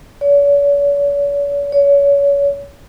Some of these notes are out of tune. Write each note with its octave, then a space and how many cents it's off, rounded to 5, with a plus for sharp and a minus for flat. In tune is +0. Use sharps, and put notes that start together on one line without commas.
C#5 +45
C#5 +30